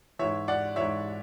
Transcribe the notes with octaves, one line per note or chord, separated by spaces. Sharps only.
G#2 E3 C#5 E5
D5 F#5
G#2 E3 C#5 E5